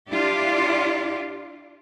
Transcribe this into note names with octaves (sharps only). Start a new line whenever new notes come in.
D4 E4 F4 G4 D5